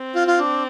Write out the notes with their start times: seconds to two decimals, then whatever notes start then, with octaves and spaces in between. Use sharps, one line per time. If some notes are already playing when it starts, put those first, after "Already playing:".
Already playing: C4
0.15 F4
0.27 F4
0.39 D4